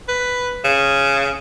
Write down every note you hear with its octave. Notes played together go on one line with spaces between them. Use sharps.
B4
C#3